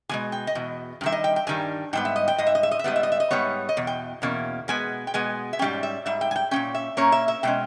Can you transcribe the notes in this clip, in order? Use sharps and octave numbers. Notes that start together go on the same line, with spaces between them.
E2 B2 G#3 G#5
G5
D#5
E2 B2
G2
D#3 G3 E5
D#5
G5
G5
G2 D#3 G3 G#5
G#2 G3 B3 G5
E5
D#5
G5
G#2 G3 D#5
E5
D#5
E5
D#5
E5
G#2 G3 B3 D#5
E5
D#5
E5
D#5
G#2 G3 B3 C#5
D#5
E2 B2
G5
E2 B2 A#3 C#4
B2 G#3 B3 G#5
G5
B2 G#3 B3 G#5
E5
G#2 G3 A#3 C#4 G5
E5
G#2 G3 E5
G5
G#5
G5
A#2 A#3 C#4 G5
E5
A#2 A#3 C#4 C#5
E5
E5
B2 G#3 C#4 G5